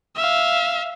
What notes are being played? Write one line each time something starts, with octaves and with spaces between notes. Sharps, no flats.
E5 F5